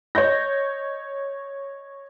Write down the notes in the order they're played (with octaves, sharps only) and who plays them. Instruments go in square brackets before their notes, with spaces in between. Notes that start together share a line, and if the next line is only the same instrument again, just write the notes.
[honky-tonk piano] C#5 D#5 G6 A#6